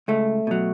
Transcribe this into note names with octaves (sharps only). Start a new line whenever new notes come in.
C#2 A3
B2 F#3